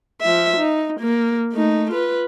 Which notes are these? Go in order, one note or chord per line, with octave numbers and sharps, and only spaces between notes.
F3 E5
D#4
A#3
A3 D#4
F4 B4